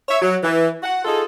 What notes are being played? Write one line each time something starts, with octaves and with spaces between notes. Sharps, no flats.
C#5 E5
F#3
E3
F#4 F#5
D#4 F4 G#4 A4